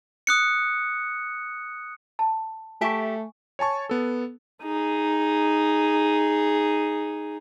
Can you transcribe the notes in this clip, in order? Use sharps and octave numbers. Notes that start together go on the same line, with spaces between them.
D#6 F#6 C#7
A5
A3 G4 E5 G#5 A5 C#6
C#5 G#5 A5 C#6
B3 A4
D#4 G#4